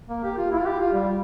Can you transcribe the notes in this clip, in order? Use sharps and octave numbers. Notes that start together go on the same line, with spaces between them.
A#3
G4
F4
E4
F4
G4
F4
G3